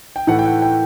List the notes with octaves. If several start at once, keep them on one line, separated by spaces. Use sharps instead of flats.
G5
A2 E3 A3 F#5
G5
F#5
G5